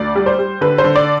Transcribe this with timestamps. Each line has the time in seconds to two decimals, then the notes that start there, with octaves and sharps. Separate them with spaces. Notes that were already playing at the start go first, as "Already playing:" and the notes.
Already playing: D2 D5
0.15 G3
0.26 C5
0.39 G3
0.61 D3 B4
0.78 C5
0.84 D3
0.96 D5